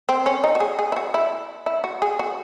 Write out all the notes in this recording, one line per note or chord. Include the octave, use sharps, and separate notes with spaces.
C4
C#4
D#4
F#4
G#4
G#4
E4
F#4
E4
E4
F#4
G#4
F#4